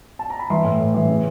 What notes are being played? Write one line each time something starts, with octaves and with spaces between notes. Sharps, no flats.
A5
A#5
B5
E3 C6
A2
A2
E3
C#3